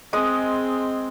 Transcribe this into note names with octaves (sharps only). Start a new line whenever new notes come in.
G#3 C4 D#6